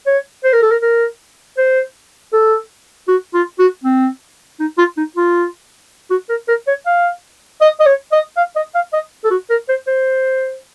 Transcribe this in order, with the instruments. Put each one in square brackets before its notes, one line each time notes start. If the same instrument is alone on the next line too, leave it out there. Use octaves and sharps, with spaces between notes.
[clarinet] C#5
C5
A#4
A4
A#4
A#4
C5
A4
F#4
F4
F#4
C4
D#4
F4
D#4
F4
F#4
A#4
A#4
C#5
F5
D#5
D#5
C#5
D#5
F5
D#5
F5
D#5
A4
F#4
A#4
C5
C5